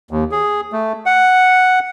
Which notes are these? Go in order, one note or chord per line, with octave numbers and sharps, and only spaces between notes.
D#2
G#4
A3
F#5